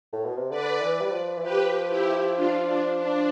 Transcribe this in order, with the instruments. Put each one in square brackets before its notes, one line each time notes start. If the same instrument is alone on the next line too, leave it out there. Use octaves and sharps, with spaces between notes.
[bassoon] A2
B2
C3
[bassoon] D3 [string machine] B4 D5
[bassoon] E3
G3
F3
E3
[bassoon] F3 [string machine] G4 B4
[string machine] E4 G4
D4 F4
D4
D4